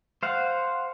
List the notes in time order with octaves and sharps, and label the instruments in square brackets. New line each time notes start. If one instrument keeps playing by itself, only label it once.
[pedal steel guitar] C5 F5 F#5